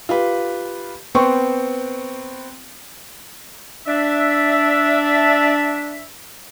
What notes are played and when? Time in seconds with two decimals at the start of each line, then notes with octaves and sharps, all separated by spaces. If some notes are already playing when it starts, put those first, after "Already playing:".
0.09 F4 G4 B4
1.15 B3 C4 G5 C6 C#6
3.87 D4 E5